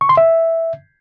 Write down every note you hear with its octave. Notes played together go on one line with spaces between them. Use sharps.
C#6
C6
E5